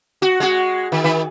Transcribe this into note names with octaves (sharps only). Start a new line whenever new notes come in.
F#4
G#3 F#4
D#3
D#3